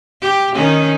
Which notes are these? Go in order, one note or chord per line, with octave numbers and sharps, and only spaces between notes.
G4
D#3 C#4 D#4